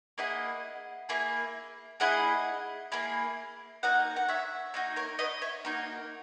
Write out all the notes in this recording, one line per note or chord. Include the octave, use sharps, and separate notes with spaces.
A#3 E4 G#4 D#5 F#5
A#3 E4 G#4
A#3 E4 G#4 D#5 F#5
A#3 E4 G#4
A#3 D#4 F#4 D#5 F#5
F#5
C#5 E5
A#3 D#4 F#4
A#4 C#5
B4 D#5
C#5 E5
A#3 D#4 F#4 A#4